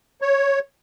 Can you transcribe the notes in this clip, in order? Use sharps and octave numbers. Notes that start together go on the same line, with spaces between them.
C#5